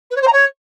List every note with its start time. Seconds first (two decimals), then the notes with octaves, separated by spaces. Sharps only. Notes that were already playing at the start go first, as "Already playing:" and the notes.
0.10 B4
0.16 C#5
0.21 C5
0.27 A#5
0.32 C#5